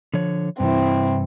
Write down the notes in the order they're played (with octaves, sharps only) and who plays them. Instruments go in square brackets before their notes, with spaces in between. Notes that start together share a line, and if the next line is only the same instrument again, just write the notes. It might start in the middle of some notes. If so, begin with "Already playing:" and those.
[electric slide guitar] D3 F3 C#5
[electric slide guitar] G2 C3 E3 [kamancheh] C4 E4